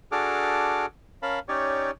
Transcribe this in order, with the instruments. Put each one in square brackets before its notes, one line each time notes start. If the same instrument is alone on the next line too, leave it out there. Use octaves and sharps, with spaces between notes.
[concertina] D4 F#4 G#4 A4 D6 F6
C#4 A#4 F5 A5 B5
C#4 D#4 G4 C#5 D5